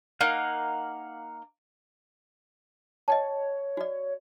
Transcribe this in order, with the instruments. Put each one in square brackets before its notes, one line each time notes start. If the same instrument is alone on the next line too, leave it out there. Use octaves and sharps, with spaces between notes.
[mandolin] A#3 D#4 [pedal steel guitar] F5 F#5
[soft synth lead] C#5 [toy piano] D#5 G5 A5
[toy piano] F#4 D5